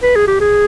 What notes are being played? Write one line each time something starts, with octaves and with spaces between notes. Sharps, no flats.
B4
G#4
G4
G#4